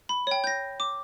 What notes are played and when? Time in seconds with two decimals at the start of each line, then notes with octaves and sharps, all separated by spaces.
0.09 B5
0.27 C#5 G5
0.44 G6 A#6
0.80 D6